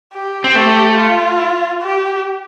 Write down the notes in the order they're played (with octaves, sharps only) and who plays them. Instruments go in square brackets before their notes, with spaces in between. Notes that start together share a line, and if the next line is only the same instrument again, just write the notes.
[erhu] G4
[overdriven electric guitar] C4
[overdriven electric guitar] A3 [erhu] G4
[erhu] F4
G4